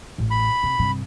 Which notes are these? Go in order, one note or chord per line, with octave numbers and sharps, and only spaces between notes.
A1
B5
C3
G2 C3